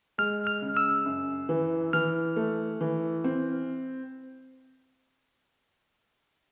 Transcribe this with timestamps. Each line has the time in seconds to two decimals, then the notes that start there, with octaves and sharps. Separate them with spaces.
0.18 G#3 F6
0.47 F6
0.62 C#3
0.77 E6
1.06 F#2
1.49 E3
1.93 E3 F6
2.36 A3
2.81 E3
3.24 C4